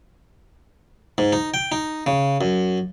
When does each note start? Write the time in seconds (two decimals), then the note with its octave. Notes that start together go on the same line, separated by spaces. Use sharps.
1.18 G#2
1.33 D#4
1.54 G5
1.72 D#4
2.07 C#3
2.41 F#2